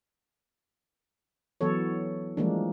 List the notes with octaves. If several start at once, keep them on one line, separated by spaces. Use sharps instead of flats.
E3 F#3 B3 A4 C#5
E3 F3 G3 G#3 A#3 D4